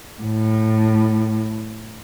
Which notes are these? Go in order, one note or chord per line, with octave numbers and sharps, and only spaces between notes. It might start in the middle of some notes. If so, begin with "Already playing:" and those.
A2